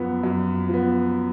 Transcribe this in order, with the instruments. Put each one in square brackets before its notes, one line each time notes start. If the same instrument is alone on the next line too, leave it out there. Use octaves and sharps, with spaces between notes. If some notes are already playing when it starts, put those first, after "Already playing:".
Already playing: [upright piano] F#2 F3 B3
F#2
F3 B3